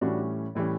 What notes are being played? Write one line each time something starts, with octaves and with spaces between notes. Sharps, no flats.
A2 E3 G3 C#4 D4 F#4
A2 E3 G3 C#4